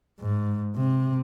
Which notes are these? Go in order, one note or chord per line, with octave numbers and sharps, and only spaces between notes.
G#2
C3